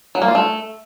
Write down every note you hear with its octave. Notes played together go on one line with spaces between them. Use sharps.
F#3
A#3
F4
A3